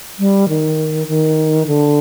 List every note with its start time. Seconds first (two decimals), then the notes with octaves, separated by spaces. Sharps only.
0.19 G3
0.49 D#3
1.08 D#3
1.67 D3